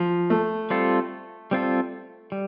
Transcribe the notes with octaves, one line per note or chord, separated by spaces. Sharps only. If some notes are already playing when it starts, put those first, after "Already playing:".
Already playing: F3
A3
G3 C4 F4 A4
G3 C4 F4 A4
G3